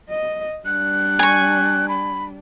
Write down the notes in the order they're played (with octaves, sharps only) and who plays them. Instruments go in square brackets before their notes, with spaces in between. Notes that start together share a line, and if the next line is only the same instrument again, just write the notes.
[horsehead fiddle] D#5
[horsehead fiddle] G3 D4 [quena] F#6
[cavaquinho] G#5 C#6
[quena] B5